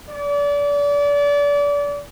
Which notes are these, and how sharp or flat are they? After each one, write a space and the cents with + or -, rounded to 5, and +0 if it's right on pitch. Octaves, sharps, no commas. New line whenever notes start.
D5 -30